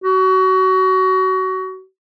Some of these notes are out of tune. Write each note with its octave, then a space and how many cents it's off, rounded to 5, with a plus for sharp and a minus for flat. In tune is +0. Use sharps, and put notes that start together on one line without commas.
F#4 +25